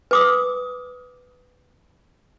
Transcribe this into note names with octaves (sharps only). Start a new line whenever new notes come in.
B4 D6 D#6